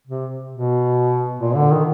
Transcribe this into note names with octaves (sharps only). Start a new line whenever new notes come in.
C3
B2
A#2
D3
D#3